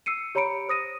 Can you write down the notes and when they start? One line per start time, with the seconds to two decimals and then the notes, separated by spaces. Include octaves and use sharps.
0.06 E6 C7 C#7 D#7
0.35 G4 C#5 A#5 B5 C#7 D7
0.69 C5 D#6 A#6 D#7